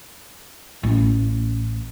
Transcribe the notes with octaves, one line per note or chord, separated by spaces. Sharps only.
A1